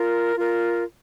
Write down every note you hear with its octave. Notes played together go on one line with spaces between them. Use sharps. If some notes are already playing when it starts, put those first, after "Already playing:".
Already playing: F4 A#4
F4 A#4